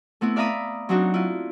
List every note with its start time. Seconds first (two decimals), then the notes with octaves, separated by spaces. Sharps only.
0.21 A3 B3 C4 E4
0.36 D5 E5 F5 A#5 B5 D#6
0.89 F#3 C4 D4 D#4 F#4
1.14 E4 F4